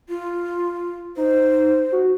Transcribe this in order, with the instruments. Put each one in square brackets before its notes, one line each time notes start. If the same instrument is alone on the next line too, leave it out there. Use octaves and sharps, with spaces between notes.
[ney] F4
[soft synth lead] D#4 [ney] C5
[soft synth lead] F#4